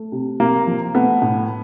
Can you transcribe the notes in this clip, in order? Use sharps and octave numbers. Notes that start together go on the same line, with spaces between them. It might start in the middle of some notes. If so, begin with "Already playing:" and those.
Already playing: A3
C3
C3 A#3
F3
A3 B3
A2